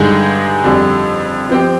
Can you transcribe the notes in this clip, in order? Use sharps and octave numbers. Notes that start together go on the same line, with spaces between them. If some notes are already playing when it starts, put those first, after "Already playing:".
Already playing: G2 D3 G#3 D#4 G#4
F2 D3 G3
F3 C4 G4